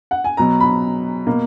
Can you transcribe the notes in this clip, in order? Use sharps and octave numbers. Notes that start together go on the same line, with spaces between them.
F#5
G#5
B2 F#3 B3 A#5
B5
B2 A#3